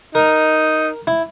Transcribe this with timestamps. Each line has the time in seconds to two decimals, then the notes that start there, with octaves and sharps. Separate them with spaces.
0.15 D#4 A#4
1.07 E4